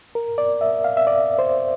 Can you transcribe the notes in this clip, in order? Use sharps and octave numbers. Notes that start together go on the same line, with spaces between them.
A#4
D5
E5
F5
E5
D5
C5